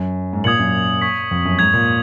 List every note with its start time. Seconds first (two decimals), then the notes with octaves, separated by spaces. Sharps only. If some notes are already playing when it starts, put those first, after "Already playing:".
Already playing: F#2
0.33 G#2
0.44 A#2 D#6 G#6 C#7 F#7
0.59 F#2
1.02 C#6 G#6 B6
1.31 F2
1.45 F#2
1.59 G#2 G#6 B6 F7
1.73 A#2